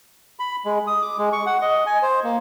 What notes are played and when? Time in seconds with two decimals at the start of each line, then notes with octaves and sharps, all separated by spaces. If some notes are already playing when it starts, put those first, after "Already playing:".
0.39 B5
0.65 G#3
0.87 D#6
1.02 D6
1.18 G#3
1.33 C#6
1.46 F#5
1.62 D#5
1.86 G#5
2.02 C5
2.24 A#3